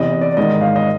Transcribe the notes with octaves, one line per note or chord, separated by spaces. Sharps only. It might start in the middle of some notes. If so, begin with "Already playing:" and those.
Already playing: E2 C3 E3 D#5
D5
G#2 D#3 D#5
F5
D#5